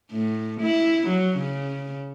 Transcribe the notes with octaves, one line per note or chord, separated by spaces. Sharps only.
A2
E4
F#3
C#3